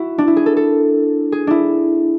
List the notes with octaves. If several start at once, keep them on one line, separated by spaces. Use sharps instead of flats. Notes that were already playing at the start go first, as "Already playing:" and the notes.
Already playing: E4 F#4
D4
E4
G#4
A4
A4
G#4
D4 E4